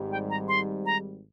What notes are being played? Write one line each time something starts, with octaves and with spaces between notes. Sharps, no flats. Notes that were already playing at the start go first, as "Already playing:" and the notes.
Already playing: G#1 G#2 G3
G5
A#5
C6
A#5